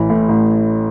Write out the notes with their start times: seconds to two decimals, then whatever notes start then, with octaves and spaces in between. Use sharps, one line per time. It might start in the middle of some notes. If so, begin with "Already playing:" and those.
Already playing: A1 E3
0.10 A2
0.29 A1